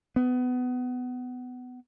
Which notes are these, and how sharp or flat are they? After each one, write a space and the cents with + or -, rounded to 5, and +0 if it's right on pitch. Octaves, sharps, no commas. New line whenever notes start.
B3 +20